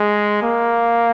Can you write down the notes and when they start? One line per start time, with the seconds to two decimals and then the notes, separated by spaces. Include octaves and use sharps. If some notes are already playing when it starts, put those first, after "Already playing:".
Already playing: G#3
0.43 A#3